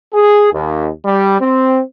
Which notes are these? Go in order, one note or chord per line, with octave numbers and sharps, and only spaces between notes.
G#4
D#2
G3
C4